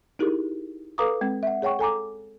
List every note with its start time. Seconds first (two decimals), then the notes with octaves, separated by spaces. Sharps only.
0.19 D#4 E4 G4 G#4 A#4
0.98 A4 B4 F5 A#5 D6 D#6
1.21 G#3 C4
1.43 E5 F#5
1.62 G#4 C#5 F#5 G5 C#6
1.79 A4 G#5 A#5 D6